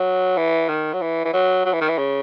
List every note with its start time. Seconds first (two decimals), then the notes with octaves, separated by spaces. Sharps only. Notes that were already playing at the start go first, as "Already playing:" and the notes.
Already playing: F#3
0.37 E3
0.68 D#3
0.93 F#3
1.01 E3
1.25 E3
1.33 F#3
1.65 F#3
1.73 E3
1.81 D#3
1.88 E3
1.98 C#3